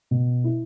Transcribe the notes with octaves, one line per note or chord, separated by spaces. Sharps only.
B2
E4